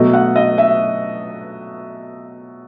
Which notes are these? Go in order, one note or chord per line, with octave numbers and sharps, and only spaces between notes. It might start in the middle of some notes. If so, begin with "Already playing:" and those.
Already playing: B2 F#3 A3 D#5
F#5
D#5
E5